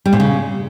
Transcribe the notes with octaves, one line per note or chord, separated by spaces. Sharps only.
G3
A#2
C#3